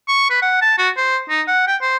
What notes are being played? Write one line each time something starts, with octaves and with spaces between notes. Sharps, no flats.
C#6
B4
F#5
A5
F#4
C5
D#4
F#5
G5
C5